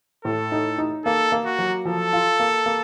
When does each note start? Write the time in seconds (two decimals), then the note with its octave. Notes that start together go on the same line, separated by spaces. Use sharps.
0.25 A2 A4
0.52 D#4
0.78 D#4
1.05 A#3 A4
1.32 A#3
1.45 F#4
1.59 F#3
1.85 F3 A4
2.13 F4
2.40 A#3
2.66 A#3